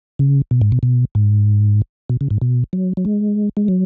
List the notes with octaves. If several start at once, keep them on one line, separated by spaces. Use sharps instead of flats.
C#3
B2
G#2
B2
B2
G#2
B2
C#3
G#2
B2
F#3
F#3
G#3
G#3
F#3